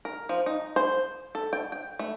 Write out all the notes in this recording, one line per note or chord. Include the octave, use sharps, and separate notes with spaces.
A#4
F3
D#4
C5
A4
G5
G5
A3